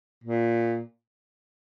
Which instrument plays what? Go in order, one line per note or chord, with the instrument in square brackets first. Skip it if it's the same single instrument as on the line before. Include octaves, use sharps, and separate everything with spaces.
[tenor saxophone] A#2